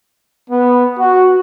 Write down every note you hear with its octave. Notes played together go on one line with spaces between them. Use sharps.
B3
F#4